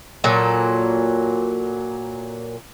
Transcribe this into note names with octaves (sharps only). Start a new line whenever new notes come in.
A#2 F#3 A4